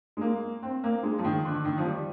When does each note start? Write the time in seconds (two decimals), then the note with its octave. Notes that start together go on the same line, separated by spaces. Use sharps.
0.17 G#3
0.21 A#3
0.63 C4
0.84 A#3
1.03 G#3
1.18 F3
1.24 D#3
1.45 D3
1.65 D#3
1.78 F3
1.86 G3